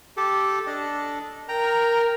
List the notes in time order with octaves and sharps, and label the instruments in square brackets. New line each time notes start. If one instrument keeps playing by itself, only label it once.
[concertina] G4 A4
D4 A4 D#5
[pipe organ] A#4 [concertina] G5 A#5